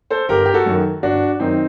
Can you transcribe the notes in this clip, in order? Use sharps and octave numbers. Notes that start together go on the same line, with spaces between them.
A4 C5
G1 G4 A#4
G4
F#4 A4
F#2 D#3
G1 D4 F#4
F#2 D#3 C4 D#4